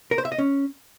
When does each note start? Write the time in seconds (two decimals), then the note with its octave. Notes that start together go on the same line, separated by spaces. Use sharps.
0.11 A#4
0.18 C5
0.25 E5
0.32 D#5
0.38 C#4